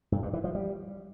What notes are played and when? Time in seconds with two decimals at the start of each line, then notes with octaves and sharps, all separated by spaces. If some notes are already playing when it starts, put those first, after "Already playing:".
0.12 G2
0.23 G2
0.33 E3
0.44 F3
0.55 G3